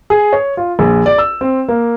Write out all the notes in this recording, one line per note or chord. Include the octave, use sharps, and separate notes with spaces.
G#4
C#5
F4
A#1
D5
E6
C4
A#3